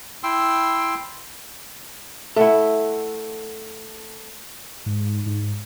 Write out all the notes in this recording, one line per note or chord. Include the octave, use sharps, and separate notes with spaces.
E4 G5 C6 E6
A3 E4 A4 F#5
G#2
G#2